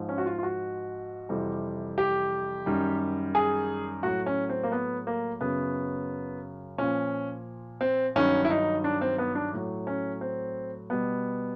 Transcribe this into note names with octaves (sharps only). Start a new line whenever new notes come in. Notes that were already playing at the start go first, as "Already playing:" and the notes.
Already playing: G#2 F3
C#4
F#4
F4
F4
F#4
F2 C3 E3 G3
G4
F#2 D#3 G3
G#4
A2 F#3 F#4
C#4
C4
A#3
B3
A#3
F#2 C#3 F#3 B3
A#2 F3 C#4
C4
G2 D#3 F#3 C#4
E4
D#4
D4
C4
B3
D4
A2 F#3
C#4
C4
B2 G3 B3